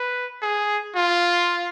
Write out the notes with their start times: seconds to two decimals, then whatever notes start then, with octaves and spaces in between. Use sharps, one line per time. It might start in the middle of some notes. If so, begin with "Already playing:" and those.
Already playing: B4
0.42 G#4
0.96 F4